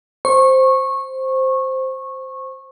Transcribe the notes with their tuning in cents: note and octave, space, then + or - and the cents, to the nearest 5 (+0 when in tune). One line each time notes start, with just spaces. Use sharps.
C5 +0 C#6 -20